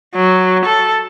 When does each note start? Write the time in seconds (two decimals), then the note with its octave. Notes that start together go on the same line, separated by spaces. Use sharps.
0.15 F#3
0.65 A4